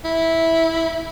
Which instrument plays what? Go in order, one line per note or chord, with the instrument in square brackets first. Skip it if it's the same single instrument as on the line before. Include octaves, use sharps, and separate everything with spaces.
[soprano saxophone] E4